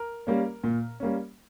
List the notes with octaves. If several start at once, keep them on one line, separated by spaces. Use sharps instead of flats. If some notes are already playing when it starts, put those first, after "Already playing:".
Already playing: A#4
G3 A#3 C#4
A#2
G3 A#3 C#4